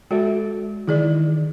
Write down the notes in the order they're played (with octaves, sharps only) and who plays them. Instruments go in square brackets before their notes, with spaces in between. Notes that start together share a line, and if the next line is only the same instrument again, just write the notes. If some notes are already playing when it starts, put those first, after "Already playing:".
[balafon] G#3 F#4 [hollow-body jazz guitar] A4 D5 E5
[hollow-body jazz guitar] D#3 E3 [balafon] E4 G#4 D5